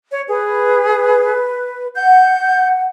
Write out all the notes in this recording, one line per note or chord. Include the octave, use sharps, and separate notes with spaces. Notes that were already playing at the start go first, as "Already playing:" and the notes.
C#5
G#4 B4
F#5 G6